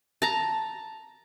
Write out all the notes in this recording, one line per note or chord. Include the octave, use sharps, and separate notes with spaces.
A5 A#5